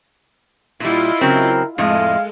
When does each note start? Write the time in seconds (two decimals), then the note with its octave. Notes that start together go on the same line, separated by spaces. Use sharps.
0.80 A#2 G3 E4 F4 D#5
1.21 C#3 F#3 C4 A#4
1.78 F2 A2 G#3 A4 D#5 F5